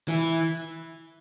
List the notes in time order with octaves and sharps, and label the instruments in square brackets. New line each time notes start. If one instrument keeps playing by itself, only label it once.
[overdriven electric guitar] E3